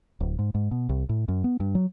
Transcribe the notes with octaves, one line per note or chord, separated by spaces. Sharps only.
D1
G#2
G#2
B2
C2
A2
F#2
B3
G2
F#3